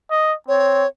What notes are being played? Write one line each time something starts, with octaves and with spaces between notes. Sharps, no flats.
D#5
C4 C#5